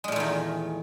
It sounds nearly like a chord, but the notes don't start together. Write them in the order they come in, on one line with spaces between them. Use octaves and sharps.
G#3 A#2 A3 E2 D#3